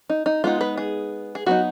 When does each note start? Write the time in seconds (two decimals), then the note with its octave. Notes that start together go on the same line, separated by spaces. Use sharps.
0.10 D#4
0.26 D#4
0.44 G#3 B3 D#4 F4
0.61 B4
0.78 G#4
1.35 G#4
1.46 F#3 B3 D#4 F#4